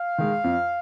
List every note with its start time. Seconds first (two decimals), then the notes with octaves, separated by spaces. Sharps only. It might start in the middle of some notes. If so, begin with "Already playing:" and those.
Already playing: F5
0.18 D#3 G#3
0.44 F2